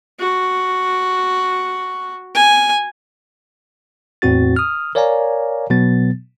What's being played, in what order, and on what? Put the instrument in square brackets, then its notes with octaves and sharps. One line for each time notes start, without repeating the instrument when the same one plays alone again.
[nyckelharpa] F#4
G#5
[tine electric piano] E2 A2 C4 F#4 A6
D#6 F6
A#4 C#5 D5 F5 G#5 A#5
B2 F#3 B3 A6